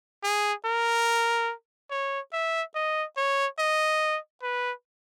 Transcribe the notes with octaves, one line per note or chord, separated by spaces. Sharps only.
G#4
A#4
C#5
E5
D#5
C#5
D#5
B4